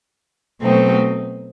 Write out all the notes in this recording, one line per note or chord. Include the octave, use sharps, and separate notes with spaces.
B2 F#3 A3 C4 D#4